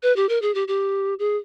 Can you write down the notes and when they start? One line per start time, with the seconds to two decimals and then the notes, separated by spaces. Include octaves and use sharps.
0.03 B4
0.16 G4
0.29 A#4
0.42 G#4
0.55 G4
0.68 G4
1.19 G#4